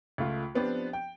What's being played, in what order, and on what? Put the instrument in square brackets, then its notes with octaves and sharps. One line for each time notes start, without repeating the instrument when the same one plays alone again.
[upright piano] C#2 A3 F4
F3 B3 C4 D4 G4
G5